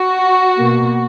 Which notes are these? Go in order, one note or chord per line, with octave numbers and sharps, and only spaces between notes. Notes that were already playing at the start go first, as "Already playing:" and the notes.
Already playing: F#4
B2 A#3